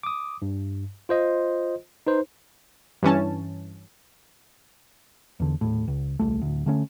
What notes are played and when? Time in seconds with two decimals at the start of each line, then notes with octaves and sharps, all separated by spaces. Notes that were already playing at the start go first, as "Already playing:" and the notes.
0.03 D6 D#6
0.42 G2
1.09 F4 C5 D#5
2.07 D#4 B4 C5
3.03 G2 E3 C#4 A5
5.40 E2 D3
5.61 D#1 A2
5.88 C#2
6.19 D#1 C2 A3
6.42 D1 D2
6.66 D3 A3 C#4